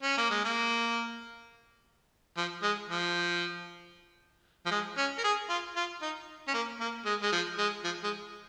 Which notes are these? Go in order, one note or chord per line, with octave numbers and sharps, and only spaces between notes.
C#4
A#3
G#3
A#3
F3
G#3
F3
F3
G#3
C#4
A#4
G#4
F4
F4
D#4
C#4
A#3
A#3
G#3
G#3
F3
G#3
F3
G#3